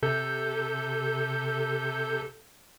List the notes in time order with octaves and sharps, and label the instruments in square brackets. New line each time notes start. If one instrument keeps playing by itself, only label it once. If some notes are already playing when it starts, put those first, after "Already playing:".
[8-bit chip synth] C3 A4 G6